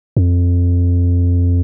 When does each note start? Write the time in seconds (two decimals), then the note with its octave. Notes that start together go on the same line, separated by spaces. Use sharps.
0.17 F2